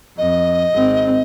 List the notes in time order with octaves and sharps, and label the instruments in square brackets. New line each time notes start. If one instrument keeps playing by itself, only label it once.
[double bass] F2 [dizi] D#5
[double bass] G#1 C4